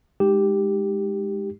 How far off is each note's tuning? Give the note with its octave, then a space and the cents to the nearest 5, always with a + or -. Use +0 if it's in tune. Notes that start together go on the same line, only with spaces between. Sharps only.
G#3 +0 D#4 +0 G4 +0